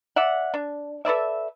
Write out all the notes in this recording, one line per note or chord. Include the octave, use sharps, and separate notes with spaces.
D5 E5 F#5
D4
A4 B4 D5 E5